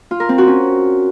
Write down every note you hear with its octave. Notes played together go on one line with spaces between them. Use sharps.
F4
A#4
C4
F#4
C#4